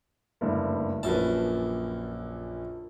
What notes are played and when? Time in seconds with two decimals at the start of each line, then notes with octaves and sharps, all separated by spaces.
0.41 F#1 D2 G2
1.03 A#1 F#2 B4 A5